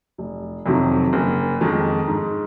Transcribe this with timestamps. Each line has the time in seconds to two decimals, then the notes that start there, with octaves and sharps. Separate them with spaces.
0.18 F1
0.66 F2 C3 D#3 F#3
1.13 F#1
1.61 F2 D#3 G#3 D#4
2.08 G#2